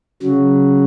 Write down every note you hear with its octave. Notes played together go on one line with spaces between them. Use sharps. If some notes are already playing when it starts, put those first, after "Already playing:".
C#3 F#3